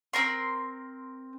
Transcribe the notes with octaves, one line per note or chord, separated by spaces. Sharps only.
C4 A#4 C6